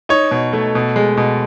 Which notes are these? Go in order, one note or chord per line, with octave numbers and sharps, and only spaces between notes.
D#4 C#5
B2
A3
B2
G#3
B2